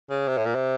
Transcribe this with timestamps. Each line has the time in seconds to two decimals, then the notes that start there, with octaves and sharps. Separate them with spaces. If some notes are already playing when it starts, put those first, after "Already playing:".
0.10 C#3
0.28 C3
0.38 A2
0.46 A#2
0.55 C3